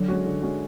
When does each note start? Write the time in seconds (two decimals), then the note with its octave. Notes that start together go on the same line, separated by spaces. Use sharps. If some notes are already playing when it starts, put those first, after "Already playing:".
Already playing: D3 F#3
0.08 G#3 C#4 F#4
0.26 D3
0.42 G#3 C#4 F#4